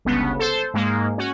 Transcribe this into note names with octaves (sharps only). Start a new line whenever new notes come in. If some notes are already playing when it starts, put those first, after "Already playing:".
G1 C#2 C#3 B3
A4 C5
G#2 G#3 A#3
C#4 F#4